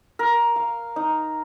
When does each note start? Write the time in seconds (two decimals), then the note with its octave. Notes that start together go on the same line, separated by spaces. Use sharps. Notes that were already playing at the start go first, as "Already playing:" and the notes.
0.19 A#4
0.56 F5
0.96 D#4